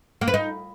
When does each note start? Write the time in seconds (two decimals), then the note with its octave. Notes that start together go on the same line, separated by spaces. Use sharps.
0.21 A#3
0.28 B4
0.34 D#4